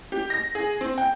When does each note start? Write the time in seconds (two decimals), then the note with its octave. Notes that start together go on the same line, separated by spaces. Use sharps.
0.12 G4
0.30 A#6
0.55 G#4
0.81 C4
0.98 G5